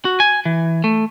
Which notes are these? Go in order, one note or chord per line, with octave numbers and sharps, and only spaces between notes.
F#4
G#5
E3
A3